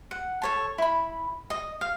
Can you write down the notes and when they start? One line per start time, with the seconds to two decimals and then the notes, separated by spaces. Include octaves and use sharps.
0.11 F#5
0.42 A4 C#5 A5
0.78 E4 B5
1.50 D#5
1.81 F5